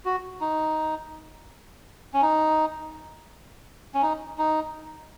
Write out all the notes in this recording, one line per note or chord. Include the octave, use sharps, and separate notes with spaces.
F#4
D#4
C#4
D#4
C#4
D#4
D#4